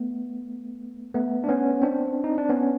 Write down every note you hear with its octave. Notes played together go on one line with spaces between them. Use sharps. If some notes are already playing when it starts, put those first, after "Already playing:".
Already playing: A3 B3
A3 B3
D4
B3 C#4
C4 D4
D#4
D4
B3 C#4